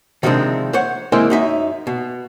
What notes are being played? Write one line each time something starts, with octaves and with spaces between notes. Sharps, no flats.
C3 D#3 F3 G#3 C4 D4
C5 C#5 F#5
D#3 G#3 A#3 C4 E4 C5
F#2 D#4 E5
B2